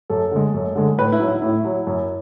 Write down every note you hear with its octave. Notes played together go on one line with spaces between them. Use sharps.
F#2 A4
D3 G#3
F#2
D3 G#3
A2 B4
E4
F#3
E4
A2 E4
F#3
F#2